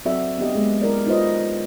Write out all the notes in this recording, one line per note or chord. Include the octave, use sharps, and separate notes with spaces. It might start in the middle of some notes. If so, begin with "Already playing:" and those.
F#3 C4 F#4 A4 D5 E5
B3 D4 G4 D#5
G#3 A#3 B3 G#4
E4 A#4 D5
D#4 F4 F#4 B4 C5 D#5